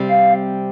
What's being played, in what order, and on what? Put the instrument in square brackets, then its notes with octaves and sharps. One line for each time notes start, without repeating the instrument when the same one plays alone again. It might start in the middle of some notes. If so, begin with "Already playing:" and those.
Already playing: [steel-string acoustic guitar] C3 G3 C4
[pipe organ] F5